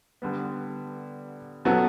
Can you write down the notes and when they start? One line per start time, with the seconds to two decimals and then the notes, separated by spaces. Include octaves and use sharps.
0.22 D3 G3 B3
1.65 B2 F#3 B3 F#4 A4